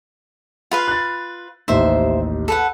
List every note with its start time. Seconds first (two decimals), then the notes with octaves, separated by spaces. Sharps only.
0.71 F4 B4 F5
0.88 F#6 A6
1.68 A1 D#2 D#4 C5 E5
2.48 A4 B4 F#5